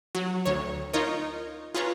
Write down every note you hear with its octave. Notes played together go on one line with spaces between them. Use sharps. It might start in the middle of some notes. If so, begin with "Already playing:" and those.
F#3
D2 C#5
D#4 F4 A#4 C#5 D#5
F4 G#4 B4 C#5 A#5